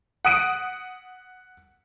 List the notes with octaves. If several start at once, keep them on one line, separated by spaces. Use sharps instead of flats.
F#5 D#6 D7 D#7